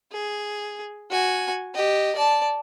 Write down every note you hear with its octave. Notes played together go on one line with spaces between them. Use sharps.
G#4
F#4 G#5
G4 D#5
D5 A5